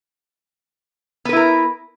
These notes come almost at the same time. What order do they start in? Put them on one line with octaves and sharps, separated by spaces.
B3 B4 E4 A#4